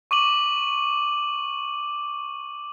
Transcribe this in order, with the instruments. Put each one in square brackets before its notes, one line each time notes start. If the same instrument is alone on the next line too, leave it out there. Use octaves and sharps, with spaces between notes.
[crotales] C#6 D6 D#7 F#7